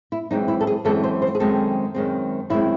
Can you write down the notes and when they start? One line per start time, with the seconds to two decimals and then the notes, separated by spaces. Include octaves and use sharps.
0.12 E4
0.31 F#2 E3 G#3 C4 D#4
0.48 E4
0.61 A4
0.67 G#4
0.85 F#2 E3 G#3 C4 A4
1.04 C5
1.22 C5
1.35 G#4
1.40 F#2 D#3 G#3 C4 A4
1.95 F#2 D#3 G#3 C4
2.50 F#2 D#3 G#3 C4 E4